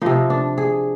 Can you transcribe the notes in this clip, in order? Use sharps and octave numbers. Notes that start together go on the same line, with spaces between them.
C3 F3 D#4
D4
G#4